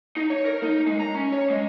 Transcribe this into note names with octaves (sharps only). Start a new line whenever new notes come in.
D#4
C#5
A#4
D#4
G#3
A#5
C#4
C#5
G#3